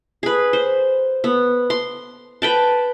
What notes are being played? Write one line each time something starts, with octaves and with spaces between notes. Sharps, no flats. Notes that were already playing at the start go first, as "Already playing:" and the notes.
G#4 B4
C5
B3
C6
B4 G5 A5